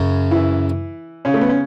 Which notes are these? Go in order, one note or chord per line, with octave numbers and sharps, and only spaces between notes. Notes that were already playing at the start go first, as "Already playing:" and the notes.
Already playing: F#2 C#3
E3 E4
C#3 C#4
A3
B3
C#4